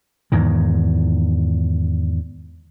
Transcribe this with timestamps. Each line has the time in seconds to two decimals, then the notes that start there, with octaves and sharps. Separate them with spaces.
0.32 E2 G#2 D#3